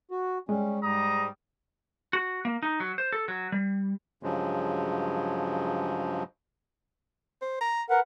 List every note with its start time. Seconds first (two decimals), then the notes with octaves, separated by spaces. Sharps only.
0.11 F#4
0.49 G3 G#3 C#4
0.82 G#2 G3 A#5 D#6
2.13 F#4
2.45 A#3
2.63 D#4
2.80 F#3
2.98 C5
3.13 A4
3.28 F#3
3.52 G3
4.23 G2 C#3 F3 F#3 G#3
7.42 C5
7.61 A#5
7.90 A#4 B4 F#5